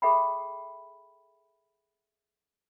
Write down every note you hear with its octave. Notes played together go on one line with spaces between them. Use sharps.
G#4 A4 E5 G5 B5